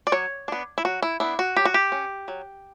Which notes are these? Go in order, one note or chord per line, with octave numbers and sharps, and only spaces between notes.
D5
F#3 C#5
B3 D4
E4
F#3 F#4
E4
B3 D4 E4
F#4
F#3 G4
F#4
G4
C#4
F#3